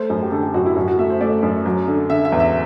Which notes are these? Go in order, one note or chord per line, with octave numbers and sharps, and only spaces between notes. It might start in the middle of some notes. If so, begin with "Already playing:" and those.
Already playing: A3 C5
F#2
G4
D3 A4
G4
F#2 F#4
E4
F#2 F#4
F#4
A3 E5
C5
A3 D5
F#2
F#3
D3
D3 E5
E5
E2
E5